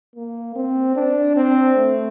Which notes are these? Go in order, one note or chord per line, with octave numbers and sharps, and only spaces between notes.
A#3
C4
D4
C4
A3